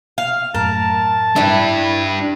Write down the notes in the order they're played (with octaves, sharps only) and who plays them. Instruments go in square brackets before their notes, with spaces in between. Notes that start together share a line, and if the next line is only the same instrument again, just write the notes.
[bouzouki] F5
[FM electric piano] F#2 A2 [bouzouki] A#4 [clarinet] A5
[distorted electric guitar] D4 G4 [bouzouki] E4 B4